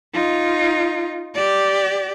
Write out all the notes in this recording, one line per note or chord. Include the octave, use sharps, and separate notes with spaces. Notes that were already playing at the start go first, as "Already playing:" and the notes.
D#4 F4
G4 D5